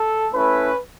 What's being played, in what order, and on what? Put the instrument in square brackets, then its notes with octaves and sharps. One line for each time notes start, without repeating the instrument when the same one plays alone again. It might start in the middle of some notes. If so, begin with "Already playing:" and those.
Already playing: [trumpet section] A4
A3 C#4 E4 B4